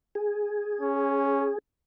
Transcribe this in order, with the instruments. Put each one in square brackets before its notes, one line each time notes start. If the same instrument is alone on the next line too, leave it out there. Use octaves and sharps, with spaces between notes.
[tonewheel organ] G#4
[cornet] C#4